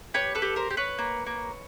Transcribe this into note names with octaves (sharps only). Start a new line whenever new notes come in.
G4 B4 C#5
A4 B4
G4
A#4 C5
G4
B4 C#5
A#3
A#3